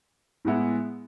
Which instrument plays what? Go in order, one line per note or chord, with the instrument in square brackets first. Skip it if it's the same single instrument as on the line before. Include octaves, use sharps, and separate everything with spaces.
[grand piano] A2 G#3 B3 E4